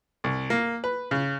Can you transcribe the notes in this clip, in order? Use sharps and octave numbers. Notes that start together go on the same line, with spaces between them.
C2
A#3
B4
C#3